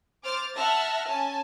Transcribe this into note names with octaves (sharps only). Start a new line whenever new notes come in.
C5 D6 F6 A6
E5 F#5 A5 E6 F6 A#6
C#4 G#5 A5